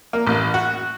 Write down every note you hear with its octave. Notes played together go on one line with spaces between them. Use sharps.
A#3
A1
F#4